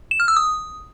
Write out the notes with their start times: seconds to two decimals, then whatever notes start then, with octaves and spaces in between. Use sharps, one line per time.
0.11 E7
0.20 F6
0.28 E6
0.37 D#6